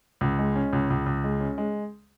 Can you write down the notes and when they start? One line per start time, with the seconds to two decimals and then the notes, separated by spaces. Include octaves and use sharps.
0.21 C#2
0.39 G#3
0.56 C#4
0.73 C#2
0.90 C#2
1.06 C#2
1.24 G#3
1.40 C#4
1.58 G#3